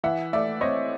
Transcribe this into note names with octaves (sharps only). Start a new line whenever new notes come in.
E3 E5 F#5
A3 D5 E5
C4 C#5 D#5